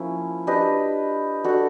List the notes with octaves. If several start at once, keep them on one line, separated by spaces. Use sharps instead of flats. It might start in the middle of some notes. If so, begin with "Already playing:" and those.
Already playing: F3 A#3 C#4 E4
D4 G4 B4 D#5
D4 F#4 A4